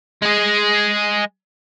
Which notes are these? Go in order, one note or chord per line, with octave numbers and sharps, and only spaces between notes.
G#3 G#4